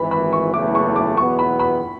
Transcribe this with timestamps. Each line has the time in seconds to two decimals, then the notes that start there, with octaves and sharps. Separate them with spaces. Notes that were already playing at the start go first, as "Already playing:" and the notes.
Already playing: G#1 G#2 E3 B5
0.11 B5
0.33 C#6
0.53 F#1 E2 C#3 E3 A3 D6
0.75 C#6
0.96 D6
1.17 E2 B2 F#3 B3 E4 C#6
1.39 B5
1.60 B5